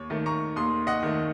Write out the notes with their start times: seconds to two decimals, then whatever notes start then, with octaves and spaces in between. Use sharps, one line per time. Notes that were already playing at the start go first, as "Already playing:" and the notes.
Already playing: D#2 C#5
0.10 D#3 A3
0.26 A#5 C#6
0.56 D#2 C6 D#6
0.87 D#5 F#5
1.03 D#3 A3